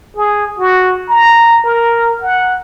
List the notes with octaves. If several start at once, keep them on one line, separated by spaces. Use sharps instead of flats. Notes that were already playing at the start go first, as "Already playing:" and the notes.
G#4
F#4
A#5
A#4
F#5